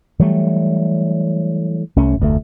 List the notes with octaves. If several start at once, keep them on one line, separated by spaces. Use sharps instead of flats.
E3 F#3 G3 A3
C2 A3 C#4
F1 D2 B2 A3